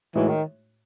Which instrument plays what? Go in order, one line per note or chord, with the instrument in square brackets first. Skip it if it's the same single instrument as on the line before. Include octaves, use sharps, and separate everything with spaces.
[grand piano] A2 G#3 D#4 F#4 [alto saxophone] E3
[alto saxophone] D#3